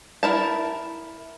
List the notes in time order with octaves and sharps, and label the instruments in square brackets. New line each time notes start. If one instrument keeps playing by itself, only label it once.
[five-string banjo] E4 A#4 A5